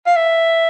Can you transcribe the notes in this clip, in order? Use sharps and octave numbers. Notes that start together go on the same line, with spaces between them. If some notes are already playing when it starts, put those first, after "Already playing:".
F5
E5